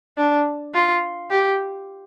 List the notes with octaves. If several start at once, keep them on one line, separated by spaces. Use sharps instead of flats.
D4
F4
G4